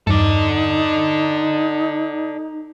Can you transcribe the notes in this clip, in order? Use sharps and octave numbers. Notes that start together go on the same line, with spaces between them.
E2 G2 D#4 A4 D5